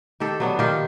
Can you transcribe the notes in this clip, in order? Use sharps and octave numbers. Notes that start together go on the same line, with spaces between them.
D#3 G4 A4
F#3 B3 D4
D#3 F4 G4